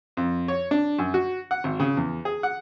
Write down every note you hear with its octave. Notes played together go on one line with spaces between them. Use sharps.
F2
C#5
D4
F#2
F#4
F#5
G#1
C#3
E2
G#4
F#5